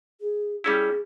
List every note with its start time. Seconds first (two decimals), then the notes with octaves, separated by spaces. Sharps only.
0.20 G#4
0.64 G3 C#4 E4 G#4